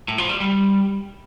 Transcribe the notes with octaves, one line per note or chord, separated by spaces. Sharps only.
A2
F3
G3
G3